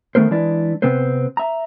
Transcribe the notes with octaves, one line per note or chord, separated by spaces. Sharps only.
D#3 A3 B3 A#4 C5
E3 G#3 D4 E4 D5
C3 B3 C4 B4 C5
E5 A#5